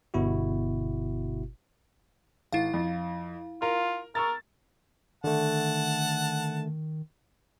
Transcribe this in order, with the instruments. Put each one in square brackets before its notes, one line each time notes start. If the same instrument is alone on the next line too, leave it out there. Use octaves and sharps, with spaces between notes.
[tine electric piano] G1 B2 E4 F#4
[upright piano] G#1 [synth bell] E4 F5
[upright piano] F2
[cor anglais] F4 [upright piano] A#4
[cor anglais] A#4 [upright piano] C#6 E6 A6
[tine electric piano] D3 A3 [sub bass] D#3 [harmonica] F#5 A5